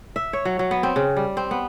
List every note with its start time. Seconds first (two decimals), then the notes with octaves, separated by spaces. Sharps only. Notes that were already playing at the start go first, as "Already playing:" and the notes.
0.16 E5
0.33 C#5
0.45 F#3
0.59 F#3
0.71 B3
0.83 C4
0.96 C#3
1.17 G3
1.37 C4
1.51 B3